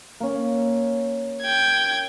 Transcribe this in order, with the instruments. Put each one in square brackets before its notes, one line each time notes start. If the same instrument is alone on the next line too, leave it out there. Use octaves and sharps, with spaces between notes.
[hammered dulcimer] A#3 C#4
[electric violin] G5 G#6